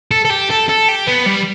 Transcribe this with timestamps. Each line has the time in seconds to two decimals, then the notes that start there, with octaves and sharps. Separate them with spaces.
0.11 A4
0.25 A4
0.30 G4
0.50 A4
0.69 A4
0.88 G4
1.07 B3
1.26 G3